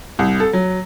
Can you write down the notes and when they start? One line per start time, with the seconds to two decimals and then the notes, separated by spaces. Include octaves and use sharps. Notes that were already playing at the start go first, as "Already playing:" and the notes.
0.19 C2
0.40 A4
0.53 F#3